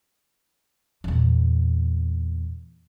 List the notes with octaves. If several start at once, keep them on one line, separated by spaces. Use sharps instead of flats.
E2 A#2